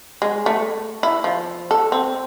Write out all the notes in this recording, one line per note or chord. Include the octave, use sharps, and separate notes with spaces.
G#3
A3
E4
F3
A4
C4